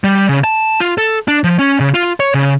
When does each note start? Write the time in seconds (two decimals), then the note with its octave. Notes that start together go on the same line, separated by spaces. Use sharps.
0.04 G3
0.29 C#3
0.44 A5
0.80 F4
0.98 A4
1.28 D4
1.44 F3
1.59 C#4
1.80 C#3
1.94 F4
2.20 C#5
2.34 C#3